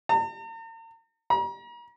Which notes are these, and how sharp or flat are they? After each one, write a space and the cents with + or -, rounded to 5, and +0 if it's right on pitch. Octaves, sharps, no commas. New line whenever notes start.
A#5 -45
A#5 +40